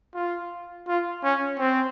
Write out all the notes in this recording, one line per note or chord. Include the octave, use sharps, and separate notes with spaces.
F4
F4
C#4
C4